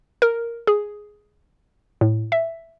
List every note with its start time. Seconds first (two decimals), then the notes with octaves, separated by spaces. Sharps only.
0.22 A#4
0.67 G#4
2.01 A2
2.32 E5